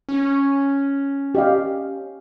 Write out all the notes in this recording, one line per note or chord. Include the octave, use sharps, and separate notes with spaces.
C#4
G4 D#5 F5